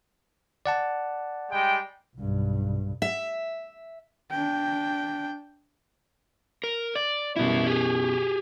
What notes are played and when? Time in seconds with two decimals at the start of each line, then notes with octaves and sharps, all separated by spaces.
0.66 D5 F#5 A5
1.50 G3 G#3 G5
2.16 B1 G2
3.02 E5
4.31 D4 G5
6.64 A#4
6.95 D5
7.36 F#2 B2 E3 G3 E4
7.66 G4 G#4